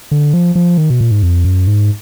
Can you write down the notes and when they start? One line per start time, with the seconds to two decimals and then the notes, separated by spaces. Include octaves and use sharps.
0.11 D3
0.34 F3
0.55 F3
0.78 D#3
0.90 B2
1.01 A#2
1.11 G#2
1.23 F2
1.45 F#2
1.67 G#2